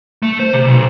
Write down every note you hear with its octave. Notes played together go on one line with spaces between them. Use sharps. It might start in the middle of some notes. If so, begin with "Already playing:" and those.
A3
C5
C3
B1